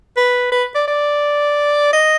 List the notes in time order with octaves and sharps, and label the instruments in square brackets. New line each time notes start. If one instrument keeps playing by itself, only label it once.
[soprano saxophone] B4
B4
D5
D5
D#5